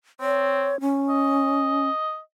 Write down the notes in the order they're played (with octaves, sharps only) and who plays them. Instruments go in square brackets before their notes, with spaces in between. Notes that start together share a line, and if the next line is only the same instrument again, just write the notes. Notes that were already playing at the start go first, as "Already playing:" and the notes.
[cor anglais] C4 [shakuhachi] C#5
[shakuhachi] C#4
[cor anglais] D#5